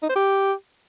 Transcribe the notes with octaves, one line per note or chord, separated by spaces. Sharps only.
D#4
C5
G4